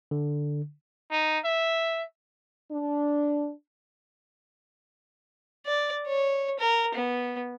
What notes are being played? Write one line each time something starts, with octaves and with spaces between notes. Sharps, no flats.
D3
D#4
E5
D4
D5
C#5
A#4
B3